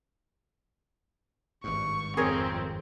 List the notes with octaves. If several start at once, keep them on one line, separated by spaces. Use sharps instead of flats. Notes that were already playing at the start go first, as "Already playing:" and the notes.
G#1 G2 C#6
F2 C4 G#4 A#4 C#5